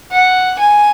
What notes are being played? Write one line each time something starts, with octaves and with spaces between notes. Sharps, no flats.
F#5
G#5